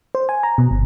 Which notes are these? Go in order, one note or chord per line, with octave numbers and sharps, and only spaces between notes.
C5
G#5
A#5
B2
G1